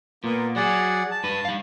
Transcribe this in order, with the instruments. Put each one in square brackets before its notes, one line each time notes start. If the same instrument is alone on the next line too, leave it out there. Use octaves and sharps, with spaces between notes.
[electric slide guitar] A#2 [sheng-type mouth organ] A#3 B3
[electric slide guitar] F#3 [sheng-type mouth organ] G#4 D5 F#5
[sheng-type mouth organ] A5
[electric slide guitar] G2 B4
G3 F5